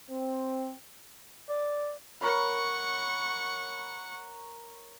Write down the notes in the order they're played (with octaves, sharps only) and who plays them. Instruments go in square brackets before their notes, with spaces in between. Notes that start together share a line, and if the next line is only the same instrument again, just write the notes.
[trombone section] C4
[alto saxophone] D5
[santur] A#4 C#5 B5 [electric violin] F#5 C#6